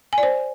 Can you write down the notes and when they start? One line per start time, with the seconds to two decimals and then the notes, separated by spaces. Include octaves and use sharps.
0.13 G#5
0.18 D5
0.23 C5